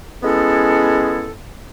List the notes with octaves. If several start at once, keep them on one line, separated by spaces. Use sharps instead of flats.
G#3 B3 C#4 E4 G#4 A4